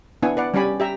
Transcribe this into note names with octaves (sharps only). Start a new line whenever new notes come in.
B3 D4 E4 F#5 G#5
B4 D5 F#5
G3 C#4 G4 D5 G#5 B5
G4 E5 A#5